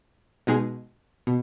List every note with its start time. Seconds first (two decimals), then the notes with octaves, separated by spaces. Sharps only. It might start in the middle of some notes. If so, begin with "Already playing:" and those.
0.47 B2 G#3 D#4 G#4
1.27 B2